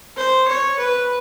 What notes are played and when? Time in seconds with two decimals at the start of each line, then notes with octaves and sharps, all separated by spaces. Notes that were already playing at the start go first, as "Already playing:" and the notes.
0.17 C5
0.48 C#5
0.79 B4